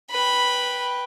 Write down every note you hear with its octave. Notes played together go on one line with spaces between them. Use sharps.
B4 G5 B5